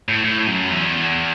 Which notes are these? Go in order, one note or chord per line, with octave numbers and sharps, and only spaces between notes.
A2
A2
F#2
E2